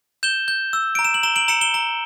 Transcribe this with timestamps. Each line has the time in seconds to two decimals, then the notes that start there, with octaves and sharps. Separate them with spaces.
0.23 G6 E7 G7
0.48 G6
0.73 E6
0.95 A#5 D7
1.05 E7
1.14 F#7
1.23 A#5 E7 G7
1.36 D7 F#7
1.48 A#5 C#7 E7
1.61 E7 G7
1.74 A#5